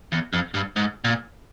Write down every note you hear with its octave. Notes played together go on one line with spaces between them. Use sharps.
E2
F2
G2
G#2
A#2